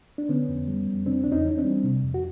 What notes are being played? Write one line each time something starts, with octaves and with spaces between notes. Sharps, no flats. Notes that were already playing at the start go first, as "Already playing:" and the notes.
D4
D3 B3 C#4
F2
G3
F2
C#3 C4 D4
E2 D4
C#4 D#4
E3
D#4
C4 D4
G3
C3
F2
F#4